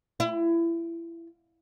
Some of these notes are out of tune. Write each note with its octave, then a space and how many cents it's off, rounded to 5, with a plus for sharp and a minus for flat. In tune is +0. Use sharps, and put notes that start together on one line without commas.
E4 +25